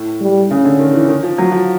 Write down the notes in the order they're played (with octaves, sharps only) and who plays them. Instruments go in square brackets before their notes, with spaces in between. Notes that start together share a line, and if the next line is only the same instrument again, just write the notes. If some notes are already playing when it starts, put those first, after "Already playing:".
Already playing: [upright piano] A2
[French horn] G3
[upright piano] C#3 [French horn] C#4
[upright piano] D3
D#3
E3
D#3
F3
F#3
F3